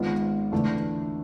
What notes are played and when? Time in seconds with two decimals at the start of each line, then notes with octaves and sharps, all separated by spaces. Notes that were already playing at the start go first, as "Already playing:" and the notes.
Already playing: G#1 G#2 G#3 B3 F4
0.52 E2 D3 A3 D4